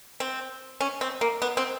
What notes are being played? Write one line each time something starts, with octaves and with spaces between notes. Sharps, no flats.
C4
C#4
C4
A#3
B3
C4